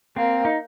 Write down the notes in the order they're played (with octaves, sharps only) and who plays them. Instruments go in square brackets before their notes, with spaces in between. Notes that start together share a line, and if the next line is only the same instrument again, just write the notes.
[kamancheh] A#3 [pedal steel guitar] C4
[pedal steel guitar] D#4